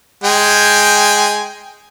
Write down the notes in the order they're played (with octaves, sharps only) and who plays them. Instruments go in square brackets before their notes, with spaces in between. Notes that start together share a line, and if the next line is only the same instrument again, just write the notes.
[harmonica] G#3 G5 G#5